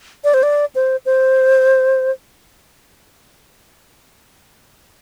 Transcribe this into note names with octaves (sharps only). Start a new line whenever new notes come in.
D5
C5
D5
C5
C5